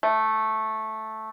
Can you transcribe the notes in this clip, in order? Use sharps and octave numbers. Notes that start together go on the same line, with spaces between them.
A3